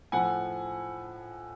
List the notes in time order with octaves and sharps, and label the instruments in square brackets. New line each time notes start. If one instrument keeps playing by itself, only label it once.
[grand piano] A2 F3 F#5 G#5